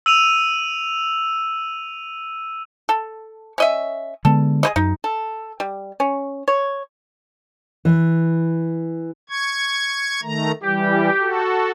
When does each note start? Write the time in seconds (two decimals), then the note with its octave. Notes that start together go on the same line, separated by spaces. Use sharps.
0.06 E6 D#7 F7
2.89 A4
3.58 C#4 D#5 E5
4.25 D3 G#3 B3 A4
4.63 G#4 C5 D#5
4.76 F#2 D#4
5.04 A4
5.60 G3
6.00 C#4
6.48 C#5
7.85 E3
9.29 C#6 G#6
10.23 D#3 A3 A#5
10.63 E3 G3 G4
11.19 F#4 A4